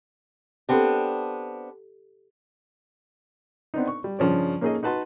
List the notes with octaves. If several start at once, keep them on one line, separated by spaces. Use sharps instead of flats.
B3 C4 D4 G4 A4
B3 C4 D4 D#4
C#6
G3
G2 C#3 F3 C#4 D5
A#3 C#4 D#4 G#4 A4 D#5
D#4 F#4 B4 A5 C6